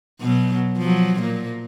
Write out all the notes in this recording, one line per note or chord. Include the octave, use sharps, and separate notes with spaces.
B2 F#3
F3 F#3
A#2 A#3